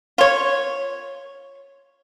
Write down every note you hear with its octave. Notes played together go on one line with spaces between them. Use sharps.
F4 C#5